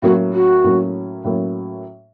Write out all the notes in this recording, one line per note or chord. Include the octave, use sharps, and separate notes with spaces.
A2 F#3 A#3 C#4 F#4
F#4
A2 F#3 A#3 C#4
A2 F#3 A#3 C#4